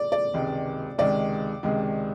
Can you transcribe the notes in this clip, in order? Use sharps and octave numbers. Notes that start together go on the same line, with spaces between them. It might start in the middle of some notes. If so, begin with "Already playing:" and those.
Already playing: D5
D5
C#2 C3 D#3 G#3
C#2 C3 D#3 G#3 D5
C#2 C3 D#3 G#3